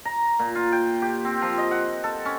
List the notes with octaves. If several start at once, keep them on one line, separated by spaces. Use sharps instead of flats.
A#5
A#2
F4
G5
G4
C4
F3
D#5
F#5
A4
C#4